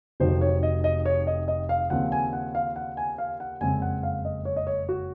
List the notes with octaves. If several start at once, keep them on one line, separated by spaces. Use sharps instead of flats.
F1 F2 D#3 F#3 C5
C#5
D#5
D#5
C#5
D#5
D#5
F5
D#2 C#3 F3 C4 F#5
G#5
F#5
F5
F#5
G#5
F5
F#5
F#1 F2 C#3 G#3 C4 G#5
F#5
F5
D#5
C#5
D#5
C#5
F#4